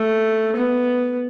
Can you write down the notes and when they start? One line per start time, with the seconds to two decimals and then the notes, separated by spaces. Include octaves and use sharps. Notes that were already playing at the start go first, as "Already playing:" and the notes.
Already playing: A3
0.56 B3